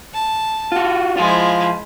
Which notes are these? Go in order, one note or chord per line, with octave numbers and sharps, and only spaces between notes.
A5
F4 F#4
F3 G#3 E4 F4